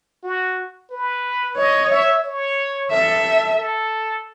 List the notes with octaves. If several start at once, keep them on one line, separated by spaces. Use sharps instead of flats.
F#4
B4
C#5 D#5
E5
C#5
A4 E5
A4